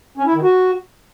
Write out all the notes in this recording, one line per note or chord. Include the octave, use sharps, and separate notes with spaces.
C#4
E4
D#3
F#4